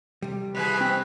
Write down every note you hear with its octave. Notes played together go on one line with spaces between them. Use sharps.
C3 G3
B2 E3 G#4 B4
C4